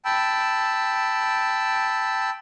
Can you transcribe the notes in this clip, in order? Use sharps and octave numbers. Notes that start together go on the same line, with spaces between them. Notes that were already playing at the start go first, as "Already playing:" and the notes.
G5 A5 B5 E6